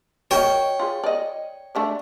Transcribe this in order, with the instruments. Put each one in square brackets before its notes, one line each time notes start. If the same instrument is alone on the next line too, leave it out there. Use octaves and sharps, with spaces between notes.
[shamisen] F#4 A#4 D#5 [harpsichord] C#5 G5
[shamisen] F4 G#4
D5 D#5
A3 D4 D5